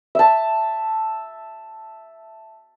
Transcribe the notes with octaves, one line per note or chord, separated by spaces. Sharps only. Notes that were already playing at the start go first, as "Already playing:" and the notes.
E5 A5